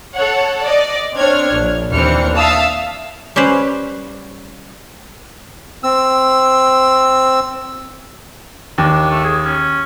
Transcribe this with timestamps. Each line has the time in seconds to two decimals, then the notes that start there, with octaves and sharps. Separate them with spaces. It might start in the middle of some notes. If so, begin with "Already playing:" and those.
0.15 A4 C#5 F#5
0.62 D5 D#5
1.15 C4 D4 C#5 F6 G#6
1.53 A#1
1.92 D#2 E3 C4 D4 F6 C#7
2.35 E5 F5 A5 D#6 E6
3.36 G3 C#4 G4 B4 C5
5.84 C4 E6
8.78 D#2 D4
9.10 A3
9.24 G#4
9.45 C#4